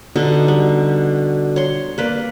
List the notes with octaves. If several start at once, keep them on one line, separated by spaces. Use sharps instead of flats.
B2 D3 D#4 G4
G3
C#5 C6
A#3 B4 D5